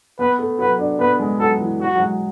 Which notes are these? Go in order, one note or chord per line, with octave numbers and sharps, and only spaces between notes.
B3 B4
A3
F#3 B4
D4
B3 B4
G#3
F#3 A4
E3
F#3 F#4
F#3
G#3